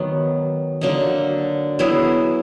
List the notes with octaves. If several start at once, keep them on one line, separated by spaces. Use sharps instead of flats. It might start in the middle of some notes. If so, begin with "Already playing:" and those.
Already playing: D#3 F#3 B3
D3 F#3 A#3 D#4
F#3 B3 E4 G#4